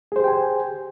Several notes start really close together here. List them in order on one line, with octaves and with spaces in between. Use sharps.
G#4 C5 G4 G5 G#5